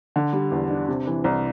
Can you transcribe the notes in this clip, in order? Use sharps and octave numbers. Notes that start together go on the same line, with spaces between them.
D3
G3
E2
D4
C3
E3
C2